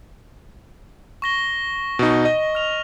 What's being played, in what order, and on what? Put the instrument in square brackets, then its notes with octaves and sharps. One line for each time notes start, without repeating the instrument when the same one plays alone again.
[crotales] C#6 A#6 G7
[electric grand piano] B2 D#4
D#5
[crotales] F6 F7